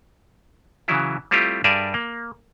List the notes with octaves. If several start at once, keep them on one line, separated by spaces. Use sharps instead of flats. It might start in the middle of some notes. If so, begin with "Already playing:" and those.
C#3 E3 F#3 E4
G3 A3 C4 E4 F4 G4
G2 G3 G#4 A#4 D5 E5
A#3